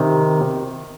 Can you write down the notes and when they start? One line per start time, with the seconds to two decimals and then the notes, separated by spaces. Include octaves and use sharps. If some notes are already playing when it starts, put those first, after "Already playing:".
Already playing: C3 D#3